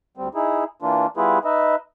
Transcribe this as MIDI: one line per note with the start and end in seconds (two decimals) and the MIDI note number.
0.17 0.29 38
0.17 0.29 55
0.17 0.29 60
0.35 0.64 63
0.35 0.64 64
0.35 0.64 68
0.82 1.06 52
0.82 1.06 58
0.82 1.06 62
0.82 1.06 65
1.17 1.39 55
1.17 1.39 59
1.17 1.39 64
1.17 1.39 65
1.17 1.39 68
1.17 1.39 71
1.45 1.75 63
1.45 1.75 71
1.45 1.75 75
1.45 1.75 76